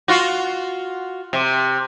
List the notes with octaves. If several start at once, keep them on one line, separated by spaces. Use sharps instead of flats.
F4 F#4
C3